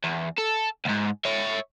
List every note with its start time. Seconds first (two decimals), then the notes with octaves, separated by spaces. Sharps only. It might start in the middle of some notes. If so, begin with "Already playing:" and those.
0.04 E2
0.38 A4
0.85 C#2 G#2
1.25 C#5 E5